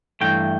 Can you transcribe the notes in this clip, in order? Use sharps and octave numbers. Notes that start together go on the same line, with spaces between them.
G2 E3 A3 G5